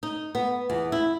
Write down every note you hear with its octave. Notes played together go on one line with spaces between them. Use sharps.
D#4
B3
E2
E4